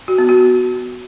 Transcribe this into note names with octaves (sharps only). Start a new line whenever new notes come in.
F#4
B3
F#4